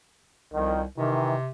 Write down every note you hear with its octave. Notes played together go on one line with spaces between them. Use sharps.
C2 F2 D#3
C3 D#3 E3